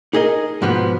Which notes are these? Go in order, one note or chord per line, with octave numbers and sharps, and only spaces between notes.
D#4 G#4 A#4 D#5
G#2 B2 F3 B3